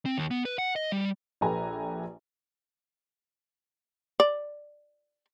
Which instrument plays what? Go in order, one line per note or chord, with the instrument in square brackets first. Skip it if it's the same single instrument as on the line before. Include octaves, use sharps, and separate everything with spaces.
[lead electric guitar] C4
D#2
B3
B4
F#5
D#5
G3
[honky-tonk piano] A#1 G4 A4 B4 G#5 A#5
[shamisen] D5